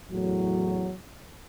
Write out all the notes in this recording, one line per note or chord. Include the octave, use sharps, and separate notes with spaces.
E2 A2 F#3